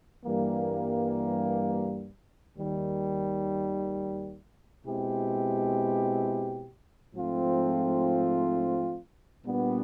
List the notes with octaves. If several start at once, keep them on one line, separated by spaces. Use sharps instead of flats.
G2 E3 G3 A#3
D#2 D#3 G3
B2 G#3 C4 E4 G4
G#2 F3 A3 C4 F4
A#2 G3 B3 D4